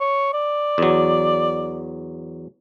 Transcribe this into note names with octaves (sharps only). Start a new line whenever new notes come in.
C#5
D5
E2 F#3